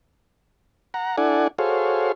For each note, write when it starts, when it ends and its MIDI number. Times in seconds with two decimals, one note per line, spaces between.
0.94 1.16 78
0.94 1.16 82
1.18 1.48 62
1.18 1.48 64
1.18 1.48 69
1.18 1.48 74
1.18 1.48 78
1.18 1.48 80
1.58 2.12 66
1.58 2.12 68
1.58 2.12 69
1.58 2.12 72
1.58 2.12 73
1.58 2.12 77